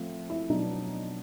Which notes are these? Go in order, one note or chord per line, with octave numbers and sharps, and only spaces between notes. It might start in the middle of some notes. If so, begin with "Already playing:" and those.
Already playing: F3 A3 C4 F4
E4
B2 F#3 B3 D4 D#4